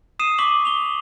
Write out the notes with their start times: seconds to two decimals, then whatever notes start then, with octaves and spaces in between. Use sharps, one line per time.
0.19 D#6 C7 D#7 E7
0.39 C#6 D6 B6 F#7
0.65 F7 G7